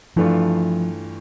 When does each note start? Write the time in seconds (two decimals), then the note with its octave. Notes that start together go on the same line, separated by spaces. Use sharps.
0.16 G2 E3 F3 A3 D4 F4